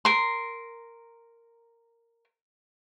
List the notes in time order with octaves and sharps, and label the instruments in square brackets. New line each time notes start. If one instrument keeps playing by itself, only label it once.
[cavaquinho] A#4 C6